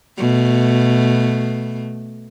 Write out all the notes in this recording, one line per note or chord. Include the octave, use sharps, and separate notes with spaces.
B2 A3